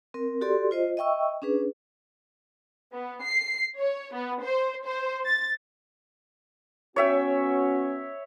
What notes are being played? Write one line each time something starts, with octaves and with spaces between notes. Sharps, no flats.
C4 A#4
F#4 G4 A4 D5 C6
F4 C5 D#5
D#5 E5 G5 C#6 E6
C#4 D4 G#4 B4
B3
C7
C#5
B3
C5
C5
A6
B3 C#4 F#4 C#5 E5 G5